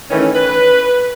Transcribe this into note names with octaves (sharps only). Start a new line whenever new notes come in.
D#3 E3 A3 C#4
B4